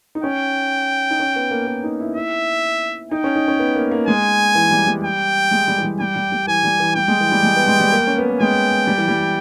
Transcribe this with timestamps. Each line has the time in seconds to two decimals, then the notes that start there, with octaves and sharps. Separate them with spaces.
0.15 D#4
0.23 C#4 G5
1.10 D#4
1.20 C#4
1.36 B3
1.51 A#3
1.67 A#3
1.84 D#4
2.00 E4
2.16 E4 E5
3.11 D#4 G5
3.24 C#4
3.36 D#4
3.48 C#4
3.59 B3
3.75 A#3
3.91 A#3
4.07 G#3 G#5
4.55 E3
4.71 G3
4.87 G3
5.04 G5
5.51 G#3
5.68 G3
5.78 E3
5.83 G3
6.00 G3 G5
6.16 G3
6.32 G3
6.47 E3 G#5
6.64 G3
6.80 E3
6.95 G3 G5
7.08 G#3
7.20 E3
7.32 G3
7.43 G#3
7.56 B3
7.68 G#3
7.80 G3
7.92 A#3
8.07 C#4
8.18 B3
8.29 A#3
8.40 G#3 G5
8.87 G3
8.98 E3
9.08 G3